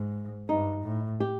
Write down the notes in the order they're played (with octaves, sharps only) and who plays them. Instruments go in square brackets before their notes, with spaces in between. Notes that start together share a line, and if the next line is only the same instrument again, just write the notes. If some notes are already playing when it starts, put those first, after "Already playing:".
Already playing: [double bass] G#2
[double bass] G2 [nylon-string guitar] D#4
[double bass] A2
[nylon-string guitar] G4